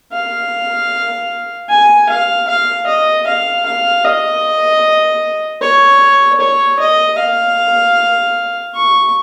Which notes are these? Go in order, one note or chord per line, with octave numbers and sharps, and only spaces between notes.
F5
G#5
F5
F5
D#5
F5
F5
D#5
C#5
C#5
D#5
F5
C#6